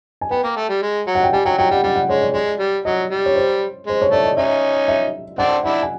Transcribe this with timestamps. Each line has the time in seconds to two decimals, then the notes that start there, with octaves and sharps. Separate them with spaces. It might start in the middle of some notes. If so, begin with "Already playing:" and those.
0.21 G#5
0.31 B3 G5
0.44 A#3
0.57 A3
0.69 G3
0.82 G#3
1.07 F#3
1.15 F#5
1.24 G5
1.33 G3 G#5
1.45 F#3 G5
1.58 F#3 G5
1.71 G3 F#5
1.83 G3 F#5
1.96 F#5
2.09 G#3 C#5
2.22 D5
2.34 G#3 D5
2.59 G3
2.85 F#3 D#5
3.10 G3
3.26 C#5
3.36 C5
3.87 G#3 C5
4.02 C#5
4.12 A3 D5
4.25 D#5
4.37 C#4 D#4 E5
4.88 E5
5.38 C4 D4 F#5
5.64 D4 E4 F#5
5.83 G#5